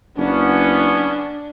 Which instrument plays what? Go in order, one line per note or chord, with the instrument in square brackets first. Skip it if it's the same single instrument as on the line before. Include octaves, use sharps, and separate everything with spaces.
[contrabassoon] F#1 [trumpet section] B3 C#4 [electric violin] D4